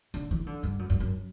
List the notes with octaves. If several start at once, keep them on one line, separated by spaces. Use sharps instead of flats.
D3
E3
D3
G2
F#2
F#2
F#2